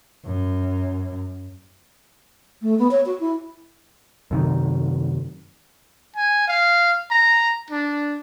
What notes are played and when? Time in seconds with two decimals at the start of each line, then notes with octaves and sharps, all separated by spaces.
0.25 F#2
2.62 A3
2.79 B3
2.91 C#5
3.06 F#4
3.20 E4
4.31 F#2 C3 D#3
6.16 G#5
6.48 F5
7.11 A#5
7.70 D4